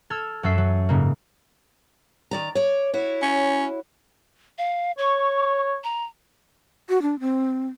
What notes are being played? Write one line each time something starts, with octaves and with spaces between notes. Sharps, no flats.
A4 E6 F6 G#6
F#2 F#3 A4 E5 C7
F#3
G#2 C#3 A#3
D#3 D5 A#5
C#5 D5
E4 F#4 C#5
C#4
F5
C#5 C#6
A#5
F#4
D4
C4